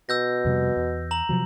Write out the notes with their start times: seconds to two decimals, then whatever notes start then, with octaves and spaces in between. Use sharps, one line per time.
0.09 B2 E6 G6 A#6
0.45 F2 C3 G3
0.76 E2
1.11 A#5 F#7
1.29 C3 F3 F#3